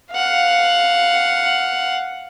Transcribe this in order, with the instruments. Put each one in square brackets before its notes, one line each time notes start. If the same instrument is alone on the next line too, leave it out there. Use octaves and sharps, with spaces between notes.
[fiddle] F5 F#5